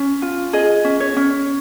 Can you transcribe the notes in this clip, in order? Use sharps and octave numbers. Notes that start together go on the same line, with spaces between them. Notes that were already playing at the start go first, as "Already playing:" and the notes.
Already playing: C#4
F4
G#4 D#5
C#4
C#5
C#4